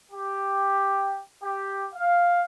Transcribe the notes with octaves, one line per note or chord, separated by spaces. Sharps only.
G4
G4
F5